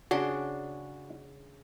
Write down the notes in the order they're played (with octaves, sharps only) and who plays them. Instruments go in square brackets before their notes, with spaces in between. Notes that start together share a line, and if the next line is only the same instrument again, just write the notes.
[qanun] C#3 D4 C6 [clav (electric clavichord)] F#4